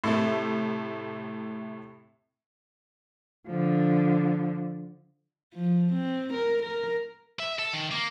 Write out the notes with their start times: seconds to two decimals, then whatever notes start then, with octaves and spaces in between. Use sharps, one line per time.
0.04 A2 C3 A3
3.47 D3 F3
5.55 F3
5.93 C4
6.33 A#4
6.63 A#4
7.39 E5
7.59 A4
7.73 D#3
7.92 A#3